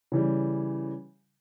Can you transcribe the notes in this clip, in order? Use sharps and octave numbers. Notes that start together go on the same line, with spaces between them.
C#3 E3 G3